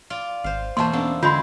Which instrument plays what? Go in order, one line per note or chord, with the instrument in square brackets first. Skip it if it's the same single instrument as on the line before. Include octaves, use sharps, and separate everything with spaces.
[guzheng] F4 D5
[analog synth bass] G#1 [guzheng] C5 F5
[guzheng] E2 B2 C5 [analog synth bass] A#3 [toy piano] A5 C6
[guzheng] A#3 D4 A4 [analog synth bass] B3 [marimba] C#4
[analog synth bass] D3 [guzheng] G#3 C4 [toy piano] F4 B5 [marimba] C6 G6